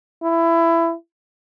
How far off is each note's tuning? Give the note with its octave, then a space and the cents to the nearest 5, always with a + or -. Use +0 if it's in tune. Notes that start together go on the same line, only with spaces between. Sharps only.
E4 +20